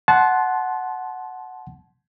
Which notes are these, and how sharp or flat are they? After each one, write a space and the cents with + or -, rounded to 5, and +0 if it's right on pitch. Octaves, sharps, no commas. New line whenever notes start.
F#5 +0 A5 -25 C6 +0